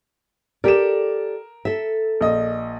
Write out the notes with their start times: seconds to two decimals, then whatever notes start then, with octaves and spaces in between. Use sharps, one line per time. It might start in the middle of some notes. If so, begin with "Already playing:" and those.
0.64 G4 A4 A#4 D5 E7
1.65 A4 E5
2.21 A#1 D#5